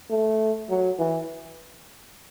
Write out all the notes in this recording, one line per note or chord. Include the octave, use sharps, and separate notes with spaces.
A3
F#3
E3